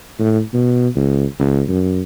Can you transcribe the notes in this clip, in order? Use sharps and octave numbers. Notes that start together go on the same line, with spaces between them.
A2
B2
C#2
C#2
F#2